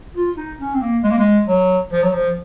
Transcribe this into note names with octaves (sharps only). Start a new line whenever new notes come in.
F4
D#4
C#4
C4
A#3
G#3
A#3
G#3
F#3
F3
F#3
F3